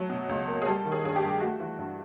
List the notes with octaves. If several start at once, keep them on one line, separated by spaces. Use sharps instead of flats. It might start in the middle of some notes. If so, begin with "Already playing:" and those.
Already playing: F#3 A3
B2
C#2
A#3
G#4
G3 A4
D#3
G#4
G2 G#4
G4
G2
A3 F#4
E3
G2